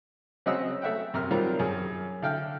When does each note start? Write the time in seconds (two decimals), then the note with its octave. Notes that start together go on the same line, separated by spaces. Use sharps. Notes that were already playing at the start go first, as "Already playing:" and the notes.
0.46 C#3 F#3 C4 D#5 F#5 E6
0.82 A3 E5 F#5 G5
1.14 F#2 C3 A#4 F6
1.31 D#3 F#3 G3 C4 F4 A#4
1.59 F#2 G#4
2.22 D3 E4 F5 G5 F6